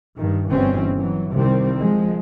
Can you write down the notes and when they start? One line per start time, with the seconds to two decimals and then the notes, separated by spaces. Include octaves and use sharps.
0.19 G2 D#3
0.50 G1 G2 B2 E3 C4 C#4
0.97 E3 F#3
1.32 C2 C3 D#3 G3 C4
1.79 F3 G#3